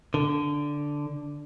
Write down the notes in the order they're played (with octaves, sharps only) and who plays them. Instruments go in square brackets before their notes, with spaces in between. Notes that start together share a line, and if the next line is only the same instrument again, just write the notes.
[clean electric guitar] D3